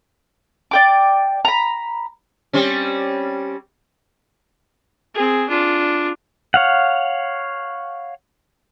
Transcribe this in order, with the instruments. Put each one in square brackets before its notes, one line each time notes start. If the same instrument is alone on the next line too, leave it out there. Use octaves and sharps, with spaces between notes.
[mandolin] D5 G5 D6
A#5 B5
[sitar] G3 C4 C#4
[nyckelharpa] C4 G#4
D4 F4
[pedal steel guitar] C#5 F5 F#5